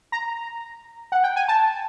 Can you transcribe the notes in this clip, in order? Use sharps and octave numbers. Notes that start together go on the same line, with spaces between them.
A#5
F#5
G5
G#5
A5